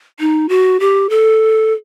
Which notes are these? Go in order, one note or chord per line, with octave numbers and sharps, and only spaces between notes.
D#4
F#4
G4
A4